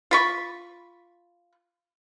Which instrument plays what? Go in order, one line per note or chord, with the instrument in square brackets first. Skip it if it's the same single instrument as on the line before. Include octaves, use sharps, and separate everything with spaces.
[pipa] F4 B5 C#6